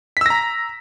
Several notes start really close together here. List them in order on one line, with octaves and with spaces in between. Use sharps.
B6 E6 A#6 A#5